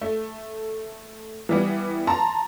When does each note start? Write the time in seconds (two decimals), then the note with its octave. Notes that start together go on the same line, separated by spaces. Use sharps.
0.01 A3
1.49 E3 G3 B3
2.07 A5 A#5 C6